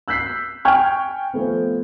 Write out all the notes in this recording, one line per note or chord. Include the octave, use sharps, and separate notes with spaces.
E6 F#6 G6 B6 C7
G5 G#5 C#6 F6 G6 G#6
F3 A3 B3